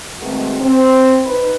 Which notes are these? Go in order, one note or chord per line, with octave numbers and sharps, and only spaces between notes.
B2 D#3 G#3 A3 C4 F#4
C4
D#4 B4